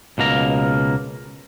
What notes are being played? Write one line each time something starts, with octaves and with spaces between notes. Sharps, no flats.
C#2 B2 A#3 A#5